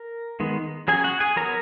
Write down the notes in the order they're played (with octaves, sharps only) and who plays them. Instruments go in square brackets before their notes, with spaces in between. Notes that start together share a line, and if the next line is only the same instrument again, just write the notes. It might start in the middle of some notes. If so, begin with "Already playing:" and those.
Already playing: [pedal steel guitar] A#4
D#3 G#3 B3
F#3 C#4 G#4 G#5
F#4 F#5
G#4 G#5
F#3 B3 A#4 A#5